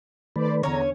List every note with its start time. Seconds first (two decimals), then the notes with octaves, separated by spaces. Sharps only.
0.36 D#3 A3 B4 C5 D5
0.63 E2 D3 C#4 C#5 A#5